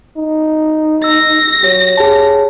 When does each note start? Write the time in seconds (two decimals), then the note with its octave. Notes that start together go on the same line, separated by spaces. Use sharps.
0.17 D#4
1.04 E6 A#6
1.63 F#3 G4 C#5
1.97 G4 G#4 C#5 A5